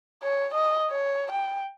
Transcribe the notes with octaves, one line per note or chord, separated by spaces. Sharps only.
C#5
D#5
C#5
G5